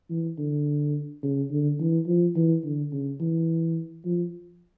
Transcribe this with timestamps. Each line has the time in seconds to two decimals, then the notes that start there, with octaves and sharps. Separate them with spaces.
0.10 E3
0.38 D3
1.23 C#3
1.51 D3
1.79 E3
2.07 F3
2.36 E3
2.64 D3
2.92 C#3
3.20 E3
4.05 F3